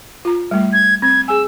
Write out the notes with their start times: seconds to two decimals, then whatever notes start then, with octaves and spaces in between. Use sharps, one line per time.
0.25 F4 A#5
0.51 G3 A3
0.73 G#6
1.02 C4 G#6
1.28 G#4 G#5 E6